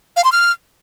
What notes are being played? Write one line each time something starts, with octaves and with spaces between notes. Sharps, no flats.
F5
C6
F6